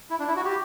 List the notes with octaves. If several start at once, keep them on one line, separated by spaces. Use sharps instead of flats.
E4
D4
E4
F#4
G4